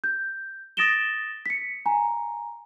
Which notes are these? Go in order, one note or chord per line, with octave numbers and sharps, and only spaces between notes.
G6
D#6 A6 A#6 D7 E7 G7
B6 C#7
G#5 A#5